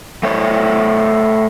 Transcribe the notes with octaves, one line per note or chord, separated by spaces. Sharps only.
A3 C5 C#5